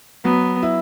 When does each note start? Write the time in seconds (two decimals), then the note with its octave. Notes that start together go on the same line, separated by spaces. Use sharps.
0.25 F#3 B3
0.63 E4